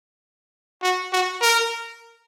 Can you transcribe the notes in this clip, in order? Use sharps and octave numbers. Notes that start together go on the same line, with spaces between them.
F#4
F#4
A#4